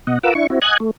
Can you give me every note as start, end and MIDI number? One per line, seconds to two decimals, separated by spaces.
0.07 0.18 47
0.07 0.18 75
0.07 0.18 78
0.23 0.34 65
0.23 0.34 70
0.23 0.34 71
0.23 0.34 78
0.23 0.34 86
0.23 0.34 88
0.35 0.47 62
0.35 0.47 64
0.35 0.47 85
0.50 0.59 60
0.50 0.59 64
0.50 0.59 66
0.62 0.77 75
0.62 0.77 78
0.62 0.77 80
0.62 0.77 90
0.62 0.77 92
0.80 0.91 57